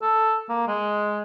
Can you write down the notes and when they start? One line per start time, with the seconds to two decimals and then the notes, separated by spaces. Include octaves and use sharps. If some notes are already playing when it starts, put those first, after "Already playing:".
0.02 A4
0.49 A#3
0.67 G#3